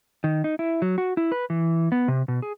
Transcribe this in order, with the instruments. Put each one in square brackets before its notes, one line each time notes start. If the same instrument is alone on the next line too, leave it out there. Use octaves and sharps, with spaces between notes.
[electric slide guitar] D#3
D#4
E4
F#3
F#4
E4
B4
E3
B3
C3
B2
G#4